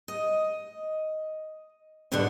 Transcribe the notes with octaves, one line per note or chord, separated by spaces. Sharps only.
D#5
D#2 G#2 B2 D3 G3 D4